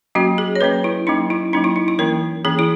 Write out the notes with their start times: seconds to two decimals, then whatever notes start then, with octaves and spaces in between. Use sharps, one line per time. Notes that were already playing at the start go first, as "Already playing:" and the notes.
0.15 F#3 A#3 C#4 F#4
0.38 G#4
0.55 C#5
0.61 F#3 A#3 C#4 B4
0.84 E4
1.07 F#3 A#3 C#4 D#4
1.30 E4
1.53 F#3 A#3 C#4 D#4
1.64 E4
1.76 D#4
1.88 E4
1.99 E3 A#3 C#4 A#4
2.44 E3 A#3 C#4 G#4
2.59 E4